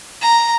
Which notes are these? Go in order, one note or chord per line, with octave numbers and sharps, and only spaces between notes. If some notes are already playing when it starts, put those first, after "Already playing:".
A#5